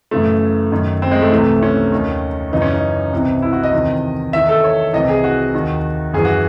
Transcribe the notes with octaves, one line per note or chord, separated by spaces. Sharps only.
F#2 C#3 E3 A3
F#2 D#3
C4
G#3
A3
C2 C3 E3
C#4
D#2 D#3
F#2 C#3 E3 D#4
C#4
D#4
C2 C3 E3
E4
F#4
D#5
E2 C3 D#3
E2 D#3 E5
A4
C#5
C2 C3 E3 D#5
G#4
F#4
D#2 D#3
F#2 E3 G#4
F#4